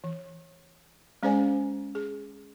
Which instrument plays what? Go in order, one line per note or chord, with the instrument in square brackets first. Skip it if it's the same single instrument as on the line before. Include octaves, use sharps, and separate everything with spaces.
[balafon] E3
G#3 C#4 G#4 C5 D5 G#5
G#4